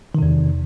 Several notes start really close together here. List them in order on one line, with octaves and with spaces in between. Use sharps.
D#3 C3 E2